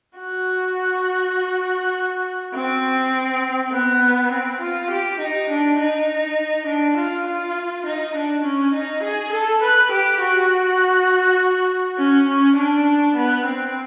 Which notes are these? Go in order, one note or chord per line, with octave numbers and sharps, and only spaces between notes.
F#4
C4
B3
C4
F4
G4
D#4
D4
D#4
D4
F4
F4
D#4
D4
C#4
D#4
G#4
A4
B4
G4
F#4
C#4
C#4
D4
B3
C4